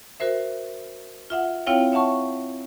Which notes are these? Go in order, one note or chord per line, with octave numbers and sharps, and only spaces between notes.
F#4 A#4 C5 E5
F4 E5 F#5
C4 E4 F4 C#5 F5 G5
C#5 E5 F#5 A5 C#6